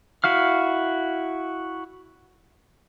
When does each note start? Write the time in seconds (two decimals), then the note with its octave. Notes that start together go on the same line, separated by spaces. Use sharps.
0.24 E4 F#4 F5 F6